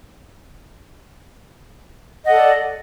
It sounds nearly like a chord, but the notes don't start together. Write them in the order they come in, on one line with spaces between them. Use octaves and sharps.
D#5 F#5 A4 D5